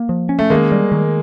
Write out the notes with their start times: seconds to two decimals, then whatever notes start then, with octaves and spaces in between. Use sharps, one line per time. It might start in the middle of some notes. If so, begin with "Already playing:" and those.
Already playing: A#3
0.09 F3
0.29 C#4
0.39 A3
0.50 D#3 G#3 A#3
0.72 G3
0.92 D#3